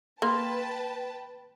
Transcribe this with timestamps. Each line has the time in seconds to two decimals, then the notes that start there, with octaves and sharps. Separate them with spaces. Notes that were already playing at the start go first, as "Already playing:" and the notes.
0.22 A#3 B4 G5 A5 C6